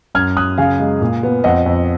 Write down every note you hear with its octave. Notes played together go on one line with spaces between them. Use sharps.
F#2 F6 G#6
F#2 D#6 F#6
C#3 F5 G#5
G#3
A#2
B3
F2 D#5 F#5
F2